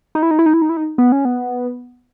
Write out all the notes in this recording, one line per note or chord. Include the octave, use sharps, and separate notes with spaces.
D#4
E4
D#4
E4
D#4
E4
D#4
E4
D#4
B3
C#4
B3